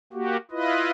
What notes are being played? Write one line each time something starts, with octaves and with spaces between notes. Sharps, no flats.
A#3 F#4 G4
E4 F4 B4 D#5